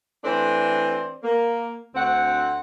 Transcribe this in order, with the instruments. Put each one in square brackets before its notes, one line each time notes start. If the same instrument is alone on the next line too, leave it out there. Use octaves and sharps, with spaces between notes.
[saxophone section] E3 A3 C4 D4 C5 D5
A#3
D2 C4 F#5